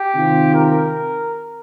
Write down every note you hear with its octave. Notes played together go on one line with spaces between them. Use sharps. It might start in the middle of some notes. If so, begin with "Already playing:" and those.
Already playing: G4
C3 D#3 C4 F4
A#4